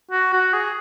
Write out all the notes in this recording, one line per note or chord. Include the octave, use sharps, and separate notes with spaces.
F#4
F#4
G#4